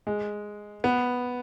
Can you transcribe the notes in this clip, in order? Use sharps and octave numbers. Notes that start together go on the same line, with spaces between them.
G#3
B3